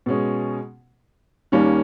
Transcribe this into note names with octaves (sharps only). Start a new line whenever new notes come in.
B2 G#3 C#4
D#2 D#3 G3 A#3 C#4